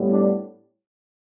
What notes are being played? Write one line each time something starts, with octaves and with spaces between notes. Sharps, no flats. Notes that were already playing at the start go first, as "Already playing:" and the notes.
Already playing: A2 G3 B3
D4